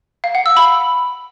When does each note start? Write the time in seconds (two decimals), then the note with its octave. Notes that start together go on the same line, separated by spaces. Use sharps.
0.24 F5
0.35 F#5
0.46 E6
0.57 B5